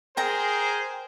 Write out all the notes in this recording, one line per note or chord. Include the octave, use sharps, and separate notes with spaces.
G#4 A#4 C5 G5 A#5